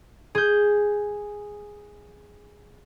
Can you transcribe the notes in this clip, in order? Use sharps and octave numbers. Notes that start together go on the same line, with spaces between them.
G#4 G6